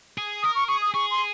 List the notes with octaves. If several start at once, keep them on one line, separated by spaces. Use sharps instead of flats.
G#4
A#4 D#6
C#6
G#4 C#6
D#6
G#4 C#6
C6